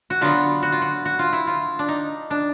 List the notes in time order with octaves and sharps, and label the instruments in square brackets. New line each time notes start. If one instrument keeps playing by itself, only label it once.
[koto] F#4
D3 F#3 B3 F4
F#4
F4
F#4
F#4
F4
E4
F4
D4
D#4
D4